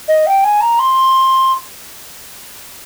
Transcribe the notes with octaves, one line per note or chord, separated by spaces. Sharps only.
D#5
G5
G#5
A#5
C6